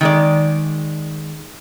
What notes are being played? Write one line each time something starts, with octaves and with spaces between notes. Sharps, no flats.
D#3 G#3 D5